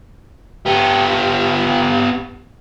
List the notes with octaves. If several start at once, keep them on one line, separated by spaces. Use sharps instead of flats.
B3 G4